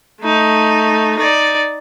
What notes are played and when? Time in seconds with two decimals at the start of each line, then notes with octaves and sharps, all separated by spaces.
0.21 A3 D#4
1.17 D#4 D5